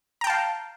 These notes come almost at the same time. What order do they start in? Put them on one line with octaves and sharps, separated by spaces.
A#5 G5 A5 F5